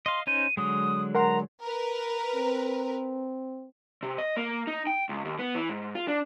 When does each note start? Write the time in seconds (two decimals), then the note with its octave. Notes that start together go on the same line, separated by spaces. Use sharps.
0.06 D#5 F5 C6
0.27 C#4 D#4 C5 D#7
0.57 D3 F#3 G#3 D#6
1.15 A#4 F#5 A#5 C6
1.63 A#4 B4
2.35 C4
4.03 C3
4.18 D#5
4.37 A#3
4.67 D#4
4.87 G5
5.09 C#2
5.25 D#2
5.39 B3
5.55 E3
5.69 G#2
5.95 F4
6.08 D4